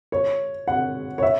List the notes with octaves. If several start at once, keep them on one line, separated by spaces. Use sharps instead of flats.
C#5
F#5
C#5
E5